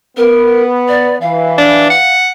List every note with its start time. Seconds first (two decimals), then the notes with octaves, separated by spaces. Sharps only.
0.17 B3 A#4
0.88 D5
1.21 E3 F5
1.58 D4
1.90 F#5